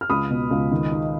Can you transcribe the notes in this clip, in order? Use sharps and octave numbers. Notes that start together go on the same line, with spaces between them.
F6
C#2 B5 D#6
B2
C#2
D#3
D#4